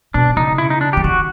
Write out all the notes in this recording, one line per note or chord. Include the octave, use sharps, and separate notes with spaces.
B2 D4
C#3 D#4
E4
D#4
D4
G4
D3
D#3 F#4